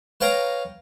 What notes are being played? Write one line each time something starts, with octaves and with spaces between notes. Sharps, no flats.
B4 C#5 F5 G5 A#5